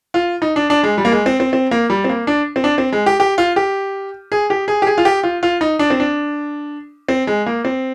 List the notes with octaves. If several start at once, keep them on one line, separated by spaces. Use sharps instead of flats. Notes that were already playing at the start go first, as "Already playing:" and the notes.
F4
D#4
D4
D4
G#3
G3
A#3
G#3
C4
C4
C4
A#3
G3
C4
A#3
D4
C4
D4
C4
G#3
G4
G4
F4
G4
G#4
G4
G#4
G4
G#4
F4
G4
F4
F4
D#4
D4
C4
D4
C4
G#3
A#3
C4